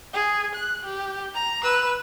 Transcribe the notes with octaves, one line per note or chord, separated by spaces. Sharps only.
G#4
F#6
G4
A#5
B4 E6